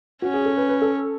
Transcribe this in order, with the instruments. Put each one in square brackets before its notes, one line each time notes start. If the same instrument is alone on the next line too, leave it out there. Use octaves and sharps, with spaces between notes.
[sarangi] C#4 [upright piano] F#4
[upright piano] G#4
A4
B4
B4
A4